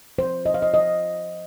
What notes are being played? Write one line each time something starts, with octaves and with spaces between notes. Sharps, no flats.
F3 C5
F3 D#5
F5
D#5
F3 D#5